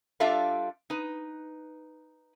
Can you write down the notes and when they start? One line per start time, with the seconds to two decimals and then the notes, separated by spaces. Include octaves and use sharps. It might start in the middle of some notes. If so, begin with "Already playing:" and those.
0.20 G3 D4 F4 A4 E5 F5
0.90 D#4 B4